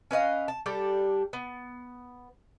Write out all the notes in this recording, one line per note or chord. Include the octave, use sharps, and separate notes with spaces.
C#4 B4 D#5 F5
A5
G3 D4 G4 A4
B3